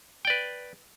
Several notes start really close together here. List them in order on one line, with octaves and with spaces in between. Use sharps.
G5 D5 B4